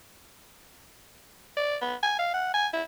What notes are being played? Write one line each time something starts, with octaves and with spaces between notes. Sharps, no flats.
D5
B3
G#5
F5
F#5
G#5
E4